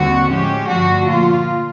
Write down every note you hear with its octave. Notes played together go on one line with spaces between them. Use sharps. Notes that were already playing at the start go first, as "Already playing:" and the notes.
Already playing: D#2 D3 G3 C4 F#4
A2 F3 G#3 C#4 G4
G2 D3 F3 A3 D4 F#4
A#2 F3 A#3 F4